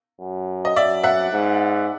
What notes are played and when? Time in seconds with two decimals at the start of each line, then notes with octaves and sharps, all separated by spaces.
0.20 F#2
0.65 D#5
0.76 F#2 D5 E5
1.04 E5 F#5
1.32 G#2